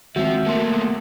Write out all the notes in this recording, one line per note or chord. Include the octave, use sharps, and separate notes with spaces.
D#3 F3 G#3 C4 F#4 E5
F#3 A3 A#3 A5 C6
B3